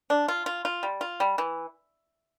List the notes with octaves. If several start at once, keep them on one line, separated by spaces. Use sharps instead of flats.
D4
F4
F4
F4
G3
F4
G3
E3